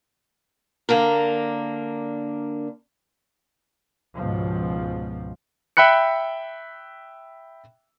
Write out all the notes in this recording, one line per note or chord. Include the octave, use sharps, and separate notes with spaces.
D3 A#3 D4 A#4
C#2 G#2 B2 F3
E5 G5 B5 F#6 C#7